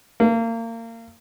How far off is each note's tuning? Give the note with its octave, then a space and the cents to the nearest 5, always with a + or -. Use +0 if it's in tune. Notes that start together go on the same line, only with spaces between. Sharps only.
A#3 -30